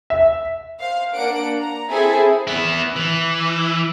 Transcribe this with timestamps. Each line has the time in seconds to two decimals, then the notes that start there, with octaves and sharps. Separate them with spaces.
0.10 E5
0.80 C5 F5
1.14 A#3 D4 F#5 D7
1.58 A#5
1.90 C4 E4 G#4 A4 E5
2.47 B3 E4
2.96 E3